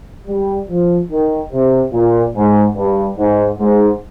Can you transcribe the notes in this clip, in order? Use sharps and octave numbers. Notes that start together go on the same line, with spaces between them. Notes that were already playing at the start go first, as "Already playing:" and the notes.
G3
F3
D#3
C3
A#2
G#2
G2
G#2
G#2